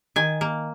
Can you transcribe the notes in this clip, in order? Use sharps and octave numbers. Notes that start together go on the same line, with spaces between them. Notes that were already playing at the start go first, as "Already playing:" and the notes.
D#3 G#5
A#3